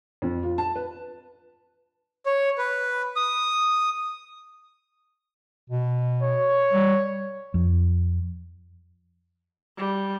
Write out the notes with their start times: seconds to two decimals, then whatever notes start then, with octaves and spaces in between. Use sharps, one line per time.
0.22 F2
0.43 F4
0.58 A5
0.75 B4
2.26 C#5
2.58 B4
3.16 D#6
5.70 B2
6.22 C#5
6.72 G3
7.54 F2
9.77 G3